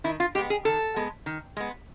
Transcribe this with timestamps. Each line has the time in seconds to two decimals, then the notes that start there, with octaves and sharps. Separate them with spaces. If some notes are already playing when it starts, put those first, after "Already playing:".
0.04 D#3 E4
0.20 F4
0.35 G#3 G4
0.39 B3
0.50 G#4
0.65 D#3 A4
0.96 G#3 B3
1.26 D#3
1.57 G#3 B3